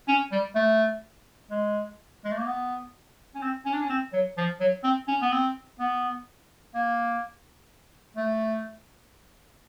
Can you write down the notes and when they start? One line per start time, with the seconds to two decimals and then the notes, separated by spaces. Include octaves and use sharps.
0.08 C#4
0.32 G3
0.55 A3
1.51 G#3
2.25 G#3
2.32 A3
2.39 A#3
2.46 B3
3.35 C#4
3.42 C4
3.66 C#4
3.73 D4
3.81 C#4
3.90 C4
4.13 F#3
4.37 F3
4.60 F#3
4.84 C4
5.08 C#4
5.22 B3
5.32 C4
5.80 B3
6.75 A#3
8.17 A3